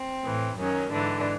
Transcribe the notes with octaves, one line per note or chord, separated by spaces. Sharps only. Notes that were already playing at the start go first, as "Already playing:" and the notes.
Already playing: C4
A2 E3
F#2 D#3 F#3 C#4
G#2 D3 E3 D4